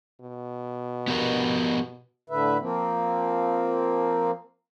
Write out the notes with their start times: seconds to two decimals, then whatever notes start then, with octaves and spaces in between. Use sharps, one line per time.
0.21 B2
1.08 B3 G4 A#4
2.30 A2 D3 B4 E5
2.60 F3 A#3 C4